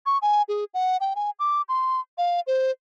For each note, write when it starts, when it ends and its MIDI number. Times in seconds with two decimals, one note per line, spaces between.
0.06 0.18 85
0.22 0.42 80
0.48 0.64 68
0.74 0.97 78
1.00 1.14 79
1.16 1.30 80
1.39 1.62 86
1.69 2.00 84
2.18 2.40 77
2.47 2.71 72